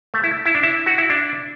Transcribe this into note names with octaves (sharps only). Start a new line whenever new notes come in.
A3
E4
E4
D4
E4
F#4
E4
D4